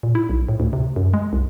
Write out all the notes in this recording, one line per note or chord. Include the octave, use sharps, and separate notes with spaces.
A#2
E4
B1
A2
D2
C3
F#2
G#3
C2